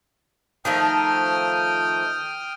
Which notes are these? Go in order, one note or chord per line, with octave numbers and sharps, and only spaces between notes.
D#3 F3 A3 G5 D#6 F6